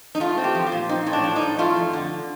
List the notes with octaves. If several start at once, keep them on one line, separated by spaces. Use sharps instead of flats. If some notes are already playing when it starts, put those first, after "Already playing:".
D#4
A3 F4
C4
G4
F3
F4
A#2
C4 D#4
A2
D4
F3
D#4
A2
A3 F4
F2
D3